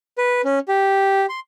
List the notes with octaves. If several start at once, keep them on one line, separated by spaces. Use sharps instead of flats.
B4
C#4
G4
C6